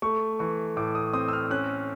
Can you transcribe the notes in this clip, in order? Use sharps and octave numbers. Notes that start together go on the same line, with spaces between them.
A3 C#6
E3 C#6
A2 D6
D#6
C4 D#6
E6
F6
C#4 F#6